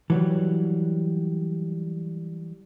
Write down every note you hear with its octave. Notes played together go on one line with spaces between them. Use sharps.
E3 F#3 G3